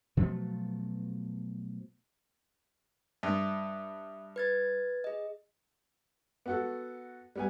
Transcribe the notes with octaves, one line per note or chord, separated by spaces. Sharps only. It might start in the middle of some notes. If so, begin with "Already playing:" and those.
B2 F3 F#3 A3
G2 E5 D#6
B4 G#6 A6
G#4 D#5
B3 F#4 A4
G3 B3 G#5